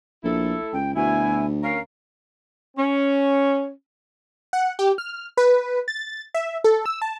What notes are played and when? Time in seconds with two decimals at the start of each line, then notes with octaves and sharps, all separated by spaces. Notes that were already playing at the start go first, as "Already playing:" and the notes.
0.24 A#1 A3 E4 A4
0.73 C#2 G5
0.96 D2 B2 E4 G#5
1.63 C#4 A#4 F5
2.77 C#4
4.53 F#5
4.79 G4
4.98 F6
5.37 B4
5.88 A6
6.34 E5
6.64 A4
6.86 E6
7.02 A5